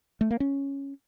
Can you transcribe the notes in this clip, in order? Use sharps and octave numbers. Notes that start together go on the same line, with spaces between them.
A3
A#3
C#4